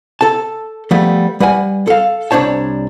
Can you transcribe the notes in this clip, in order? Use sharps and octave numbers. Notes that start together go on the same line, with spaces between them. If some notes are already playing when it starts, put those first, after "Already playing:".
A4 A5
F3 G3 A3 B3
G3 B4 F#5 G#5
A4 F5
C2 D4 C5 C#5 A5